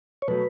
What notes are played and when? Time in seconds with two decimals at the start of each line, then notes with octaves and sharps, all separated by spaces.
0.22 C#5
0.28 B2 F#3 A3 B4